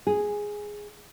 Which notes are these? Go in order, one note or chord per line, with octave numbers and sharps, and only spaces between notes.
G#4